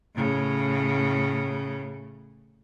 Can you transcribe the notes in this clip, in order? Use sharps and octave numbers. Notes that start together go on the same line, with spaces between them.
A2 C#3